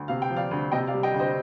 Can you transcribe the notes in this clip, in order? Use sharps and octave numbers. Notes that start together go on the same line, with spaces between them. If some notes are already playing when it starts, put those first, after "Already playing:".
Already playing: D2
C3 F5
G5
F3
D5 F5
D2
C3 D#5 G5
D5 F5
G3
D#5 G5
D2
C5 D#5